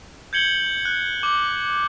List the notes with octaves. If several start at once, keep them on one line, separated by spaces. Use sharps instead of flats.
G6 G#6 C#7 F#7 G7
F#7
F#6
D6